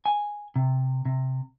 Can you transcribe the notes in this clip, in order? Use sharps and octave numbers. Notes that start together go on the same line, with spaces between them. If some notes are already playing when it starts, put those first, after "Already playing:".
G#5
C3
C3